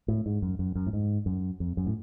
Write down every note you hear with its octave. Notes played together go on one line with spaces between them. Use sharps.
A2
G#2
F#2
F#2
F#2
A2
G#2
F#2
F2
F#2
A2